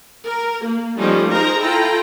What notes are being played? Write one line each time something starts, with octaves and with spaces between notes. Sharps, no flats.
A#4
A#3
F3 G3 A3 C#4 D#4
D#4 G#4 A#4 C5 A#5
E4 F4 A4 G5 A#5